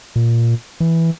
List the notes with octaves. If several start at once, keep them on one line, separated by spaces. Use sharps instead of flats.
A#2
E3